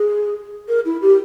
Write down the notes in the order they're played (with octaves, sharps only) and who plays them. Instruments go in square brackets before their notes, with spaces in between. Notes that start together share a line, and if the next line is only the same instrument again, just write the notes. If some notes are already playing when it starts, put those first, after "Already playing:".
Already playing: [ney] G#4
A#4
E4
G4